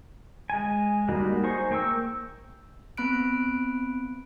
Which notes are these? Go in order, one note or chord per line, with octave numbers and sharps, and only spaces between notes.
G#3 G#5
G3 G#3 A#3 D#4 F#4
D#4 G#4 C5 C#6
A#3 G5 C#6 E6
B3 C4 B5 F#6 D7